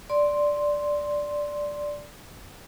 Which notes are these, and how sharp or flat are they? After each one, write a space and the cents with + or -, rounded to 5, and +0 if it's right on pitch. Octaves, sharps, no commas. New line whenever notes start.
D5 +0 C6 +0